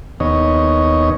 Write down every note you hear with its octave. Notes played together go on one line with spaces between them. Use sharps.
D#2 B3 C#5 D#5